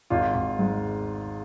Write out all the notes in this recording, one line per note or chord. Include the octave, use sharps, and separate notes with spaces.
G#1 F4
G#1
G#2